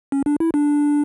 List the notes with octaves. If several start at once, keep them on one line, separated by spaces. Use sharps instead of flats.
C#4
D4
E4
D4